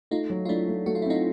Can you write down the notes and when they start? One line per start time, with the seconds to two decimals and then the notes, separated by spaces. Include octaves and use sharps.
0.11 A3 D#4 F4
0.30 F#3
0.45 F4
0.49 A3 D4 E4
0.68 A3
0.86 A3 F#4
0.95 F4
1.02 E4
1.06 C4 D#4 F4